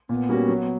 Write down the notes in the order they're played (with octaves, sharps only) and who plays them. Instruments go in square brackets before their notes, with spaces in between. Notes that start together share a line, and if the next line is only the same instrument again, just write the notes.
[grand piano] A#2 [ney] B3
[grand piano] G3 A#3 C#4 F#4
F#3